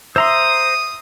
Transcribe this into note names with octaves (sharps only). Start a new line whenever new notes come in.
C5 E5 A#5 C6 D#6 E6